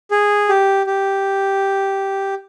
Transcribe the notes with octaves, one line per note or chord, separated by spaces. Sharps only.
G#4
G4
G4